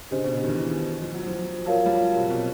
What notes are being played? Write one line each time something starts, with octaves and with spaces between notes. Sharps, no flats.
C#3 D4 G4 C5 D#5
B2
B2
D#3
E3
F3
F#3
F3
F#3 F4 A#4 C#5 F5 A5
G3
F#3
C3
B2